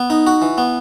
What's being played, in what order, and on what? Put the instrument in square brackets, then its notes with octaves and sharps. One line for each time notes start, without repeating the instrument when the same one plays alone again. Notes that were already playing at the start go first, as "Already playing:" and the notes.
Already playing: [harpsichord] B3
D#4
F#4
E3
B3